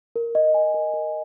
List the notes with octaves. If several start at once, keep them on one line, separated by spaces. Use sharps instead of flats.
A#4
D#5
G#5
A#4
A#4